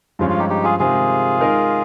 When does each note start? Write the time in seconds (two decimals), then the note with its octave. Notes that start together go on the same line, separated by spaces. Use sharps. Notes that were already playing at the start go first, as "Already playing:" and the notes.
0.19 G2 F3 G#3 C#4 F4
0.30 F4
0.39 D#4 G4
0.49 D#4 G4
0.64 F4 G#4
0.79 C3 D#3 G#3 C4 F4 G#4
1.39 G#3 D#4 A#4 D#5